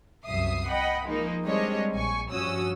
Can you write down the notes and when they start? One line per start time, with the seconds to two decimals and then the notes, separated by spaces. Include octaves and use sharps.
0.24 C2 F#2 E5 D#6 C7
0.69 D#5 F#5 G5 B5
1.05 F3 G#3 A#3 D#4
1.43 G3 G#3 C4 D4 C#5 D#5
1.92 A#1 G#5 C#6
2.30 G2 F3 C#4 F#4 D#6 E6